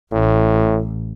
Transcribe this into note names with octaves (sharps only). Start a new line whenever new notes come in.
A1 A2